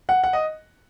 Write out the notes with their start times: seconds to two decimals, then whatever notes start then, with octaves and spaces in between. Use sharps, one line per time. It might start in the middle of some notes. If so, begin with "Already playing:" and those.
0.09 F#5
0.24 F#5
0.33 D#5